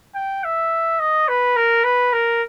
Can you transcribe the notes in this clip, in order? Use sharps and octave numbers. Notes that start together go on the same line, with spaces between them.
G5
E5
D#5
B4
A#4
B4
A#4